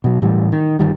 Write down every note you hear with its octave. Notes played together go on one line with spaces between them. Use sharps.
B2 F#3
A2 E3 G3
D#3
G1 D#3 G3